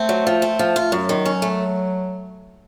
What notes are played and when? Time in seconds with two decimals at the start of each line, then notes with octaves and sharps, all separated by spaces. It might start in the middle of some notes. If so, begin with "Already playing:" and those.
Already playing: A3 C4
0.09 F#3
0.27 F3
0.42 C4
0.59 F3
0.76 F4
0.92 F#2 F#3
1.09 D#3
1.25 C#4
1.42 A3